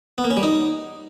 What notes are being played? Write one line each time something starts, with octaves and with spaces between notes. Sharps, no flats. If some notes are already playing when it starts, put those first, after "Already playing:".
B3
A#3
C#4
G3
D#4